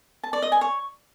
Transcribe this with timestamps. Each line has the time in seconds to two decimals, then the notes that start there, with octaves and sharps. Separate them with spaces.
0.23 A5
0.33 D5
0.42 D#5
0.52 G#5
0.61 C#5